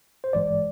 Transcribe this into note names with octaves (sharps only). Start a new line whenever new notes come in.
C5
A1 G#2 E3 G#3 D5